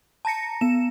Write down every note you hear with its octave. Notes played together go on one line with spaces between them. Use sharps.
A5 A#5 A#6 C#7
B3 E7